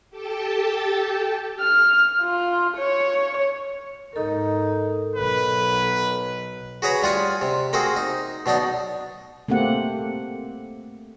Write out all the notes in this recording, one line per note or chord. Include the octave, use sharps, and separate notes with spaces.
G4 A4 G5 A5
F6
F4
C#5
G#2 D#4 A4 A#4
B1 B4
F#4 G#4 B4 C#5 A#5 B5
G3 F4 F#5 G#5
C3
A#3 C4 F#4 G#4
D#4
B2 F#3 D4 D#4
A3 A#3 C4 G4 F#5